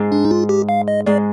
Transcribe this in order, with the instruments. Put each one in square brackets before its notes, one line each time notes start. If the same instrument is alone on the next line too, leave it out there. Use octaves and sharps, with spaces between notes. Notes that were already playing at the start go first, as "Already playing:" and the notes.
Already playing: [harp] G#2 G#3
[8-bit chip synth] D4
D#4
F4
G4
F5
D#5
[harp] G#2 G#3 [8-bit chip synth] D5